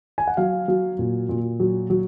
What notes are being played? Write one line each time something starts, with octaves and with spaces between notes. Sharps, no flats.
G#5
F#5
F#3 F5
F#3
A#2
A#2
F#3
F#3